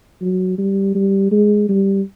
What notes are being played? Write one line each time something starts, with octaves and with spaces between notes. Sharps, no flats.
F#3
G3
G3
G#3
G3